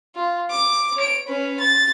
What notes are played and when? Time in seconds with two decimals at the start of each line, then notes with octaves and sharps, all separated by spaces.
0.15 F4
0.50 D6
0.97 C#5 D7
1.28 C#4 B4
1.60 A6